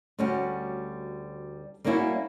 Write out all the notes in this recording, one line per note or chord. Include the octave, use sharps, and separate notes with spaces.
D2 G3 C#4 F#4 G4
G3 A#3 B3 C#4 E4 F#4